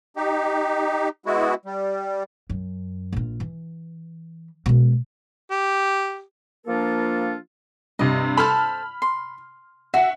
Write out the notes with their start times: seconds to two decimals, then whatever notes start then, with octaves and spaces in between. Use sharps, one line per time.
0.16 D#4 G4
1.26 G#3 B3 E4 F#4
1.65 G3
2.50 F#2
3.12 A#1 F4
3.40 E3
4.66 B2 G#3
5.51 G4
6.67 F3 A#3 D4 F4 A4 A#4
7.99 G2 C3 D#5
8.37 A4 C5 A5 B5 F6
9.02 C6
9.94 F#4 E5 F#5